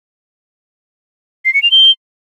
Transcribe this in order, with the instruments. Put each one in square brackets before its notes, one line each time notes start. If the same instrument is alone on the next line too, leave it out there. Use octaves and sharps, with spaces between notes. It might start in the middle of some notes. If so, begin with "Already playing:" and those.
[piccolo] C7
C#7
F7
G7